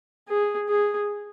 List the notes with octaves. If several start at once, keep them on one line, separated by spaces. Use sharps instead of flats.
G#4
G#4